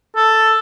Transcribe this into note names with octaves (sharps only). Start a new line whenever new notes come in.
A4